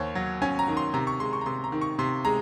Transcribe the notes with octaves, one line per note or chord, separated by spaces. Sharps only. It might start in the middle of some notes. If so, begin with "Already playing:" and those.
Already playing: D#2 D#3 C5 C#5
F#3
C#4 G#5
A#5
D#3
C6
C3 A#5
C#6
G#3 C6
C#6
A#5
C3 C6
A#5
D#3
C#6
C3 C6
G#3 A#5